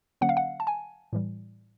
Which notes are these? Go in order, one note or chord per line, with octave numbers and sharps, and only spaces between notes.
D3 F#3 A#3 C#4 F#5
F5
F#5
A5
G#5
A2 E3 G3